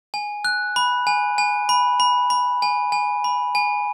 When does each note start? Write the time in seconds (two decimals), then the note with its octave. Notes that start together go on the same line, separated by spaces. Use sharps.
0.14 G#5
0.45 F#6
0.76 B5
1.07 G#5
1.38 G#5
1.69 B5
2.00 B5
2.30 B5
2.62 G#5
2.92 G#5
3.24 B5
3.55 G#5